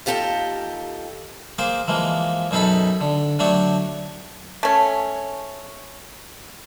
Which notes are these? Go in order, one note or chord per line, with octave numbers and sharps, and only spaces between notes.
D#2 F4 G4 A4 G5 A#5
A#3 G#4 C5 D6
E3 F3 G#3 A#3
F#2 B2 D#4 G#4 A4 B5
D3
D3 F#3 A3 D4 G4 C#5
A3 C#4